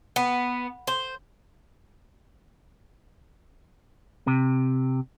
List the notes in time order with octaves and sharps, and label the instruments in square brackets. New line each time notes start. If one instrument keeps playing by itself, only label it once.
[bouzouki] B3
C5
[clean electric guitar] C3